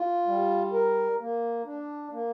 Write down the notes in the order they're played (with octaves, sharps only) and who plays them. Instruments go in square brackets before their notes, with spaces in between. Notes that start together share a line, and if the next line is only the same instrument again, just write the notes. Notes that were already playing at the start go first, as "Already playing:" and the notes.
Already playing: [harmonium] F4
G3
A#4
A#3
D4
A#3